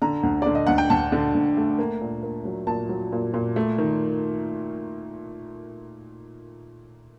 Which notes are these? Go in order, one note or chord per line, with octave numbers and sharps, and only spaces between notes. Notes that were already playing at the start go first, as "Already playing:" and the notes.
D3 A#5
D2
D3 D5
D#5
D2 F#5
G5
D2 A5
D3
D2
A3
A#3
A#2
A#3
F#3
A#2 A5
F#3
A#2
A#2
A3
D#3